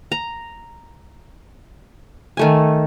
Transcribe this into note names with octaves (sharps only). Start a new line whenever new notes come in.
A#5
D#3 A3 G#5